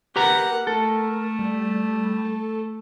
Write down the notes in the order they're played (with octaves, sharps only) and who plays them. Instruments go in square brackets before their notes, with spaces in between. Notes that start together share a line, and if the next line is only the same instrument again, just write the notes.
[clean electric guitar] G4 B4 A#5 [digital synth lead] A#4 [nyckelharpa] F#5
[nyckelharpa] A3 [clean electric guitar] A4
[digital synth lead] G3
A4